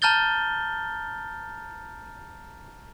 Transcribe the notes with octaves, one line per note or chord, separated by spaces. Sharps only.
A5 A#5 F6 G6 A6 G7